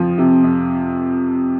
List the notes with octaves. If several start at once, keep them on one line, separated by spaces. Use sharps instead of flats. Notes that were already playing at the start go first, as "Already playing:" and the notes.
Already playing: F2 F3
C3
F2